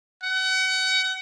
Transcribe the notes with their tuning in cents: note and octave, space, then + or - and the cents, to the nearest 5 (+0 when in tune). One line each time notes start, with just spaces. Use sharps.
F#5 +35